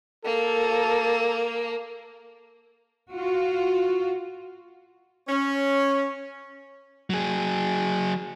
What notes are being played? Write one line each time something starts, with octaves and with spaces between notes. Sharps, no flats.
A#3 A4
F4 F#4
C#4
F#3 G#4